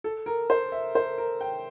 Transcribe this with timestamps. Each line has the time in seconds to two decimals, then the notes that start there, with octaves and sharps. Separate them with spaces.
0.04 A4
0.26 A#4
0.50 C5
0.72 E5
0.95 C5
1.18 A#4
1.41 G5